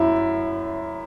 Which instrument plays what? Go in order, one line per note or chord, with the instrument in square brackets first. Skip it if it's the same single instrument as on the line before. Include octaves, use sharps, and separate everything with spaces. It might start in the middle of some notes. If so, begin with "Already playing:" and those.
Already playing: [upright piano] F#2 E4